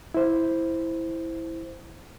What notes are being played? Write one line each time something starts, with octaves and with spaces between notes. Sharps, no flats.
E4 C5